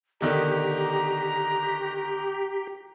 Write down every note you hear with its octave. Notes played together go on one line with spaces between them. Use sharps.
B2 D3 D#3 G4 A#5